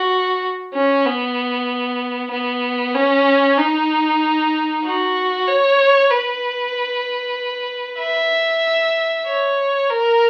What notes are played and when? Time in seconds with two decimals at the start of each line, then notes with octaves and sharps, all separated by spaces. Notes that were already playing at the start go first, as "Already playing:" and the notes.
Already playing: F#4
0.74 C#4
1.05 B3
2.32 B3
2.95 C#4
3.58 D#4
4.85 F#4
5.48 C#5
6.10 B4
8.00 E5
9.27 C#5
9.90 A#4